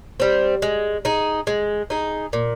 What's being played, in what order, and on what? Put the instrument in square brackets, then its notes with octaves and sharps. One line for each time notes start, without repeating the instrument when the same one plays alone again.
[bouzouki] G3 C4
G#3
D#4 G#4
G#3
D#4 G#4
A#2